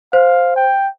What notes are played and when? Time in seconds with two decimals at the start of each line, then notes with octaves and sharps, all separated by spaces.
0.13 C5 F5
0.56 G5